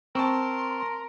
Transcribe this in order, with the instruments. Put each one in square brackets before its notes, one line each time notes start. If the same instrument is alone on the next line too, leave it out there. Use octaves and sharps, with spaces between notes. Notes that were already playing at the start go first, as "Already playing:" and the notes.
[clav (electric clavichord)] C4 [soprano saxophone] A#4 [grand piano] A5 C#6 [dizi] C6